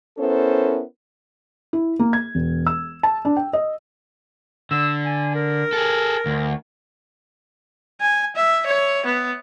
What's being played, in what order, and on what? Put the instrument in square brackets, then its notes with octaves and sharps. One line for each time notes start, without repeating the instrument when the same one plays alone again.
[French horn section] B3 C#4 E4 A4 A#4 C5
[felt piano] E4
A#3
G#6
E1
E6
A5
D4
G5
D#5
[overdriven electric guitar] D3 [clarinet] E6
[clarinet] G#5
A#4
[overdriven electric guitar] G#4 A4
D2
[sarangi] G#5
E5
C#5
B3